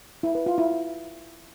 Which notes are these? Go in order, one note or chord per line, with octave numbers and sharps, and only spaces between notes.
E4
B4
F4
E4